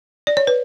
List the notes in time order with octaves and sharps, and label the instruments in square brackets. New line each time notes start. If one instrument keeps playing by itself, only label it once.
[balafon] D5
C#5
B4